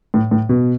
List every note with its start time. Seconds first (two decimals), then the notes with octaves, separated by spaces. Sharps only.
0.14 A2
0.31 A2
0.49 B2